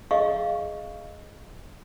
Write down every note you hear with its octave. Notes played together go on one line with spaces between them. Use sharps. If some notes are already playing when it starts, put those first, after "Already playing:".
G#4 D#5 F5 C#6